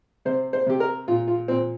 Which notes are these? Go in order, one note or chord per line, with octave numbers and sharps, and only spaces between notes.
C3 C5
C5
C3 G4
A#4
A#2 F4
F4
A#2 C4